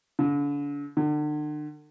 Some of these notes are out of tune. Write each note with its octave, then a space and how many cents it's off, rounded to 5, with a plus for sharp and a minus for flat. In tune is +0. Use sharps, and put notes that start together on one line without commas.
D3 -35
D3 +40